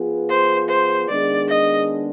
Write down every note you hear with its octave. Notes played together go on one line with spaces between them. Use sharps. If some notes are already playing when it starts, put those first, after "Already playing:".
Already playing: F3 B3 F4 G#4 B4
C5
C5
D#3 G#3 B3 D4 G#4 D5
D#5